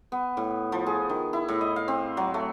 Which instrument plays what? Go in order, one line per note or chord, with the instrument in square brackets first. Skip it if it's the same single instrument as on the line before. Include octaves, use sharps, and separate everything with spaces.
[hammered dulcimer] B3
A2
F3
G#4
D#3
E4
A2
D#5
F5
C4
F#3
A3